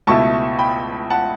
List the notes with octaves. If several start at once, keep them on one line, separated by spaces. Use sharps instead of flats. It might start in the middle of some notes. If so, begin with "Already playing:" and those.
C#2 B2 A3 E4 A5 C#6
G5 B5
F#5 A5